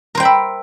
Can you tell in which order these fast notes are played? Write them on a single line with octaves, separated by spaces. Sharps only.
A#4 C5 G5 B5 E5